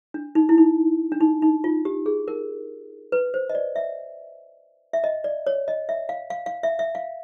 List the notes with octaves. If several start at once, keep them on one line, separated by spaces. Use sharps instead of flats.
D4
D#4
E4
D#4
D4
D#4
D#4
F4
G4
G#4
A#4
B4
C5
D#5
D5
E5
E5
D#5
D5
C#5
D#5
E5
F5
F5
F5
E5
E5
F5